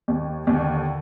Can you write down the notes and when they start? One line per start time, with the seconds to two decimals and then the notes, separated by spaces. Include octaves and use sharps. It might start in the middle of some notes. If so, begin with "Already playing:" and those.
0.08 D#2
0.47 D#2 D3